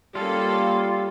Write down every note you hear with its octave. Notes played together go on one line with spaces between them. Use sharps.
G3 A#3 C#4 F4 A4 F5